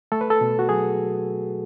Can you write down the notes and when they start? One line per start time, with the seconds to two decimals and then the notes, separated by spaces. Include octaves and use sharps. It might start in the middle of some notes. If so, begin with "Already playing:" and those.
0.12 A3 A4
0.21 B4
0.30 A4
0.41 B2
0.59 F#4
0.69 F#3 G#4